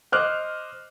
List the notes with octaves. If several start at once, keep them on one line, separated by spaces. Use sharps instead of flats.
C5 D#5 D6 F6 F#6